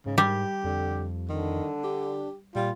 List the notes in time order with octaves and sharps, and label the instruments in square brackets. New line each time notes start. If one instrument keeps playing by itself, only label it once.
[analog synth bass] G#2 [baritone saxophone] C#3
[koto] G3 [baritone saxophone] G4
[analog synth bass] F2 [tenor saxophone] D3
[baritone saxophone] D3 [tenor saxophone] D#3
[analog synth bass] D4 [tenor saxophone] G4
[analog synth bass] A#2 [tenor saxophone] G3 [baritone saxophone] F4